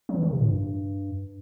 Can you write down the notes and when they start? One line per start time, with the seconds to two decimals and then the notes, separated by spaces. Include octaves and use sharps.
0.09 F#3
0.15 E3
0.23 D#3
0.31 C3
0.40 A2
0.49 G2